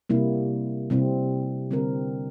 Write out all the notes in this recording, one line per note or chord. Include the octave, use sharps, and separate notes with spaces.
C3 G3 A#3 E4
C3 G3 C4 E4
D3 G3 C4 G4 A#4